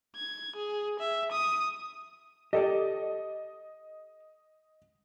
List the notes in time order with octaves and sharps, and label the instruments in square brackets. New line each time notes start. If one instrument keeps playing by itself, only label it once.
[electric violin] G#6
G#4
E5
D#6
[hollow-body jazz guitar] G4 A4 D5 [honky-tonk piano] D#5